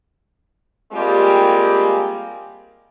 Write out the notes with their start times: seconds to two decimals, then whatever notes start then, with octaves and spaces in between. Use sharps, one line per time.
0.92 G3 G#3 A#3 C4 F4 G4